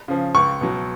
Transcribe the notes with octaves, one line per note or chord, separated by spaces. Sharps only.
C#3 F3
C#2 C#6
B2 F#3